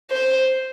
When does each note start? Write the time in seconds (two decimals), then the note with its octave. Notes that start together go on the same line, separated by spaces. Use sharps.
0.11 C5